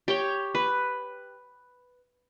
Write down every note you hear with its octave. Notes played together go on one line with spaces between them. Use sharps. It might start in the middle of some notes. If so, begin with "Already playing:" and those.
G4 C#5 G5
B4